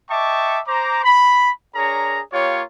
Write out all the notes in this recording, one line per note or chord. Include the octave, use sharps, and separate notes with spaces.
D#5 E5 G5 A5 C#6 D6
C5 A#5 D6
B5
D4 G#4 A#4 C#5 A#5
A#3 F4 G4 C#5